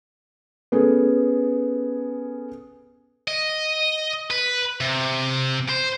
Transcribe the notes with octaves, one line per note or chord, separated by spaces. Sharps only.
B3 C#4 G#4 A4
D#5
B4
C3
C5